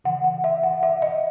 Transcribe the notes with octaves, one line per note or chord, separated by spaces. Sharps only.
C#3 E3 F#5
F#5
E5
F#5
F#5
E5
D#5